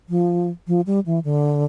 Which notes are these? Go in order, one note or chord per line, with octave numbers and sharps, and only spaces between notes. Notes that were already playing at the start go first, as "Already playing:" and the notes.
F3
F3
G3
E3
D3